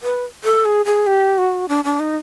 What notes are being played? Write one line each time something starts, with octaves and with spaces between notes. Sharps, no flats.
B4
A4
G#4
G#4
G4
F#4
D4
D4
D#4